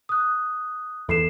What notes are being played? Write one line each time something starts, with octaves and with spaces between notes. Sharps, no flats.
D#6 F#6
E2 A4 C7 E7